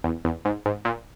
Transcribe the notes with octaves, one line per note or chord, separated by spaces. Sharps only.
E2
E2
G#2
G#2
A#2